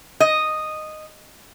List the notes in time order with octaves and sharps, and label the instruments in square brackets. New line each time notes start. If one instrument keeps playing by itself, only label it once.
[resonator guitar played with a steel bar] D#5